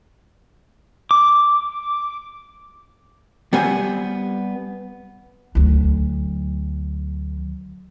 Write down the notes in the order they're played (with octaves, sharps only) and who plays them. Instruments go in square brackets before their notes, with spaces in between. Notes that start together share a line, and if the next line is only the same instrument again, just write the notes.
[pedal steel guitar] D6
[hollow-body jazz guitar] G3 B3 C4 C5 G#5
[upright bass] D2 F#3